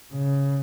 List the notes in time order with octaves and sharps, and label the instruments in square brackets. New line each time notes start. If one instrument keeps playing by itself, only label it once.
[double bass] C#3